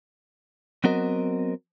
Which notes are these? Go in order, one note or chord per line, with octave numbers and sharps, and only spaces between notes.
F#3 B3 C4 F#4 A#4 D#5